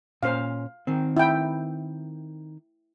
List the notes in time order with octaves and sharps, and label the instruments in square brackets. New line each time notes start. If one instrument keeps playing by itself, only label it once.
[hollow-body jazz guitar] A#2 C#4 C5 [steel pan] F5
[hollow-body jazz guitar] D#3 C4
[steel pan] E4 G5